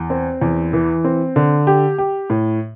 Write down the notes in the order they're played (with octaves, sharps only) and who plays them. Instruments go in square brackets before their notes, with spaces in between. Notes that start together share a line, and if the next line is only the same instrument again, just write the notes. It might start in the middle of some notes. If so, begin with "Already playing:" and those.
Already playing: [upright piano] E2
C4
E2
E3
C4
D3
G4
G4
A2